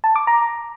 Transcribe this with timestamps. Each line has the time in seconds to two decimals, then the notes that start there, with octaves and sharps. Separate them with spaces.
0.04 A5
0.16 D6
0.27 A#5